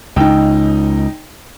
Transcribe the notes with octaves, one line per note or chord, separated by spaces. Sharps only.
C#2 D#4 G5